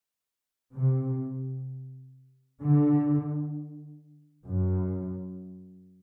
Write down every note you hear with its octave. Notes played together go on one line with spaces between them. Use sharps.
C3
D3
F#2